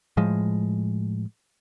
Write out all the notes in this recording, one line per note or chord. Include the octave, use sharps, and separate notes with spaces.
A2 F3 G#3